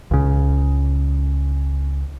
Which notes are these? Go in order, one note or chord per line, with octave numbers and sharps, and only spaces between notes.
C#2 C#3